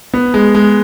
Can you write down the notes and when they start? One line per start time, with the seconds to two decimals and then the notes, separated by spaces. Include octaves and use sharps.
0.14 B3
0.34 G#3
0.55 G#3